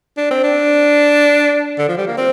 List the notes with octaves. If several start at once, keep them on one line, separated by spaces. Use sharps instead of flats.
D4
C4
D4
D3
F3
G3
A#3
C4